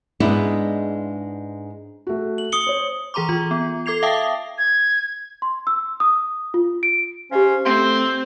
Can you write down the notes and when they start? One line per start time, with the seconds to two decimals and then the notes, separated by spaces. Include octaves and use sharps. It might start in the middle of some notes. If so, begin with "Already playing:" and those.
0.20 G#2 G#3 B3 D4 E4
2.07 A3 F#4
2.38 F#7
2.52 D#6 C#7 G7
2.67 C5 C#5
3.14 E3 G#4 A#5 C6 D6
3.29 E3 F4
3.51 B3
3.86 A4 D6 G#6 C7 F7
4.03 E5 F5 G5 A5 D6 D#6
4.58 G#6
5.42 C6
5.67 E6
6.00 D#6
6.54 F4
6.83 D7
7.31 C#4 G4 C5 D#5 F5
7.65 A3 C4 C6